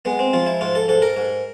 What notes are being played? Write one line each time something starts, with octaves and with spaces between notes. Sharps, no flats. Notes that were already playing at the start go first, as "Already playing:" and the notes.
G#3 B3
C4
F3 F4
E4
G#2 F4
A4
G#2 A4
A#4
G#2